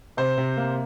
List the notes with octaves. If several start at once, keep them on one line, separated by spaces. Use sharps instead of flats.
C3 C5
C3
A#3